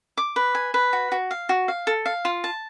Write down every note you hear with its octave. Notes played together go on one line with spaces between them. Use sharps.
D6
B4
G#5
B4
F#4
F#4
F5
F#4
F5
A4
F5
F4
A5